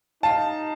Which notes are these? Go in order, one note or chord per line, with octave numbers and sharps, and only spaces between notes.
D#4 F5 A5